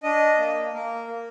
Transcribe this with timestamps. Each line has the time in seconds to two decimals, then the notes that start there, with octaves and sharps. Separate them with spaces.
0.03 D4 D#5
0.38 A#3
0.73 A#3 A#4
1.08 A#3